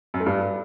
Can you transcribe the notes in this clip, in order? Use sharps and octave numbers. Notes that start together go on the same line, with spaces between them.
F#2
A3
G2